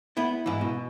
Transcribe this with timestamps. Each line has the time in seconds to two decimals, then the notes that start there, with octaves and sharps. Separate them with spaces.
0.17 B3 E4
0.46 G#2 E3
0.61 B2